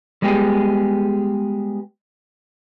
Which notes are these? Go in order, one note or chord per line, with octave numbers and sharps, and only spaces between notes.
G3 G#3 B3 G4 G#4